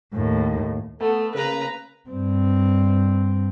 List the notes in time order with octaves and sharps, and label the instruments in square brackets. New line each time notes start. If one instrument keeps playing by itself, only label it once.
[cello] D#2 A2
[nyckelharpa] A3 [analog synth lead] B3 [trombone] A4
[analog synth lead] C#3 [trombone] A#3 [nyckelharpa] B4 A#5
[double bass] G2 C4